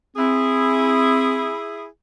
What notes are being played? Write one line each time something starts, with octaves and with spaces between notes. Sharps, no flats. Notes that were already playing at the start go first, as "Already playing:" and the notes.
C4 E4 G#4